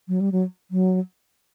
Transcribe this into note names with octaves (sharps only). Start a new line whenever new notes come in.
F#3
G3
F#3
F#3